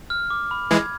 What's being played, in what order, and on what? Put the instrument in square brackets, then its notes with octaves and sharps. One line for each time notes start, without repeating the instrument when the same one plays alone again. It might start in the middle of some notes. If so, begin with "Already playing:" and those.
[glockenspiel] F6
D6
B5
[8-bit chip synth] E3 G#3 [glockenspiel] G#6